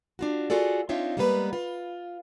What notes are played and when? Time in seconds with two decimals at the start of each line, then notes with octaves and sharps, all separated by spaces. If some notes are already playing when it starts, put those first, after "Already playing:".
0.19 D4 F4 F#4
0.50 F4 F#4 G#4 A4 D5
0.89 C4 D4 D#4 F4 C#5 E5
1.17 G3 G#3 A#3 B3 B4
1.53 F4